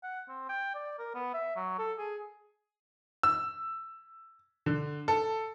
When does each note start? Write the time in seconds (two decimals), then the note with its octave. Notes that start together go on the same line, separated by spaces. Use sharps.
0.03 F#5
0.29 C4
0.49 G5
0.75 D5
0.99 A#4
1.14 B3
1.34 E5
1.56 F#3
1.79 A4
1.98 G#4
3.23 E6
4.66 D3
5.08 A4